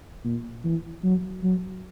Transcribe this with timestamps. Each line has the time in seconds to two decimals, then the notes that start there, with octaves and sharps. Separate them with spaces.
0.24 A#2
0.65 E3
1.03 F#3
1.43 F#3